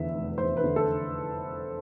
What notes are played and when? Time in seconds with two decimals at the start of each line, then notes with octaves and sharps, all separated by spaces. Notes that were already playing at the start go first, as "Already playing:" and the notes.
Already playing: F1 E2 D3 E5
0.12 F1
0.38 E2 C5
0.57 B4
0.64 D3
0.76 A4